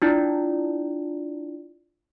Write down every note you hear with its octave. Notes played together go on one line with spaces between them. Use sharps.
D4 E4 F4 D5